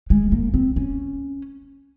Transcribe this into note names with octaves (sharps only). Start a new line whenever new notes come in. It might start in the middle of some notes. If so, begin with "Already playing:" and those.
G#3
A#3
C4
C#4